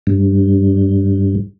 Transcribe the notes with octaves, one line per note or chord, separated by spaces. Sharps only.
G2